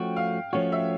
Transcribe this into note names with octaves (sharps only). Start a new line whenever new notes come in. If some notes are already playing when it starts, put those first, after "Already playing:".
Already playing: F3 A3 C#4 F#4 G5
F5
F3 A3 C#4 F#4 C#5
E5